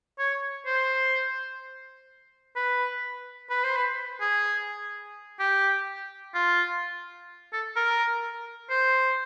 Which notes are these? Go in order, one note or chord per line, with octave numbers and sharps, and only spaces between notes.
C#5
C5
B4
B4
C5
B4
G#4
G4
F4
A4
A#4
C5